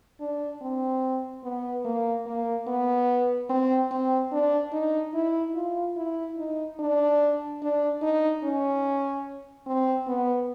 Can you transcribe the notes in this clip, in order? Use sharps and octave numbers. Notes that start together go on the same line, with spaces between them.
D4
C4
B3
A#3
A#3
B3
C4
C4
D4
D#4
E4
F4
E4
D#4
D4
D4
D#4
C#4
C4
B3